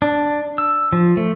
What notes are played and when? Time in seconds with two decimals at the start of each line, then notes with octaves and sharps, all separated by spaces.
0.02 D4
0.58 E6
0.93 F3
1.17 A3